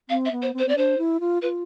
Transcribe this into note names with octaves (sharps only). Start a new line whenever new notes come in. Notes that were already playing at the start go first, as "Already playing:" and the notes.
C4 F5
E5
B3
C5
C4
C5
C4 D5
D4 C5
E4
F4
F4 B4